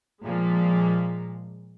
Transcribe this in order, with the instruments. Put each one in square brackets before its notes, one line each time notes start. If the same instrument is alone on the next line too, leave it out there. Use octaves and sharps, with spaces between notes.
[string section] A#2 F3 G#3 A#3